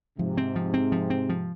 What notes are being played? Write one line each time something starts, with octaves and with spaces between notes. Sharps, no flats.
G#2 C3 F3
C4
F3
C4
F3
C4
F3